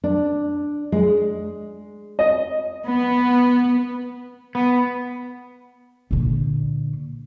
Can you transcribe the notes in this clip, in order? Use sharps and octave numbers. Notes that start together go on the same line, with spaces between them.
D4
G#3
D#5
B3
B3
A#2 D3